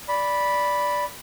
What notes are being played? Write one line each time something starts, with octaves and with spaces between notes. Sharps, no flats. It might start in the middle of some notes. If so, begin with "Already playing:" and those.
D5 B5